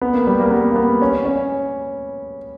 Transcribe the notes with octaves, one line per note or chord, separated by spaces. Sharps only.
B3
A#3
G3
A#3
B3
A#3
B3
C#4
C#4